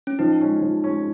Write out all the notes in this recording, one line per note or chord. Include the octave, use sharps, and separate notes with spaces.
C#4
F3 D#4
G#3 C#4
F3
G#3 C#4